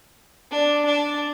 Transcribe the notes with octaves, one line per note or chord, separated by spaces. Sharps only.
D4
D4